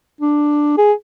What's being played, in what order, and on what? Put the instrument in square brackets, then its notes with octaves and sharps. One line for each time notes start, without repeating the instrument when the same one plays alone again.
[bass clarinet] D4
G#4